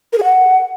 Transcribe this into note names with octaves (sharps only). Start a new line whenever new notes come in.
A#4
G#4
F#5